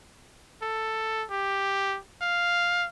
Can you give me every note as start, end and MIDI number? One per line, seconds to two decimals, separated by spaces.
0.62 1.25 69
1.31 1.97 67
2.21 2.87 77